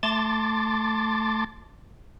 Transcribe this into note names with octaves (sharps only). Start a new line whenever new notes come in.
A3 A5 C6 D6 A6